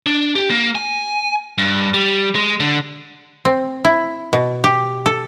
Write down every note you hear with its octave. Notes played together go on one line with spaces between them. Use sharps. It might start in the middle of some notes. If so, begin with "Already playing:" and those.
D4
G4
A#3
G#5
G2
G3
G#3
D3
C4
E4
B2
G4
A4